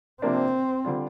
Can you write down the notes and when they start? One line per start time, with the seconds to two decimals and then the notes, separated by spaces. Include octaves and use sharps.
0.22 C3 F3 A#3 C4 D4
0.85 D3 G3 D4 F4